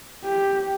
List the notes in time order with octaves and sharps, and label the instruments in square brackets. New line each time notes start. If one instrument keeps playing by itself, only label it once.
[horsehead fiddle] G4